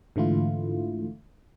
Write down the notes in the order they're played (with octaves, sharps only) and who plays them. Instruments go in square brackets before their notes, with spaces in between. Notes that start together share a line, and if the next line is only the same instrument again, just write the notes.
[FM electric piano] G#2 D3 E3 A3 E4 F4